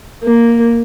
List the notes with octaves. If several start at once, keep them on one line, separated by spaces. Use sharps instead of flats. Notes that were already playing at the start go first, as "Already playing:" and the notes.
A#3